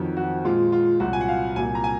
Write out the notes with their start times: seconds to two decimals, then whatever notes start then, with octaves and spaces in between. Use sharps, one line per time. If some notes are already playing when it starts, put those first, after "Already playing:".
Already playing: F2 D#3 F#3
0.17 F#4
0.45 A#2 G#3 F4
0.72 F4
1.00 C2 A#2 F#3 F#4
1.13 G#5
1.21 F#5
1.28 F5
1.56 C2 A#2 F#3 A#3 G#5
1.75 A#5
1.84 G#5